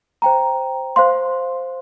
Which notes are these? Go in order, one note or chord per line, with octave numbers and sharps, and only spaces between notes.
C5 G5 A#5
C5 F5 C6